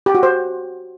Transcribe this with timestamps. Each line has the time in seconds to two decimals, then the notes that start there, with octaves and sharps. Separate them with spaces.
0.06 G4
0.15 F#4
0.23 C5